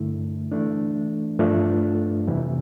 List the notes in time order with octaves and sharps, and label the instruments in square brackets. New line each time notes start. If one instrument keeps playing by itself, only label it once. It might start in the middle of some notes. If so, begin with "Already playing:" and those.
Already playing: [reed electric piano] G2 D3 A3 E4
E3 A3 D4
G2 F3 A3 D4 F4
F2 C3 E3 G3